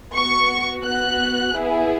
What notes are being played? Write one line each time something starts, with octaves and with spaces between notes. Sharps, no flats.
B3 F#4 C#6
B3 F#4 F#6
B3 E4 G#4